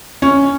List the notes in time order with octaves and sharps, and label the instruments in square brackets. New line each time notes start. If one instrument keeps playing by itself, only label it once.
[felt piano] C#4